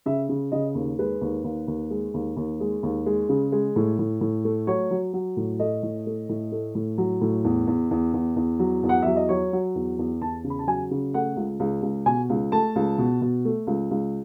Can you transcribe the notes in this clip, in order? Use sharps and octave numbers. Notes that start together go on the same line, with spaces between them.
C#3 E5
C#3
C#3 D#5
D#2
G#3 B4
D#2
D#2
D#2
G#3
D#2
D#2
G#3
D#2
G#3
C#3
G#3
A2
A2
A2
A3
F#3 C#5
F#3
F#3
A2
A3 D#5
A2
A3
A2
A3
A2
F#3
A2
E2
E2
E2
E2
E2
F#3
E2
F#5
F#3 E5
D#5
F#3 C#5
F#3
E2
E2
E2 A5
C#3
B5
A5
F#3 G#5
C#3
A3 F#5
C#2
C#2
C#2
B2 G#5
C#2
A3 A5
C#2
B2
B2
A3
C#2
C#2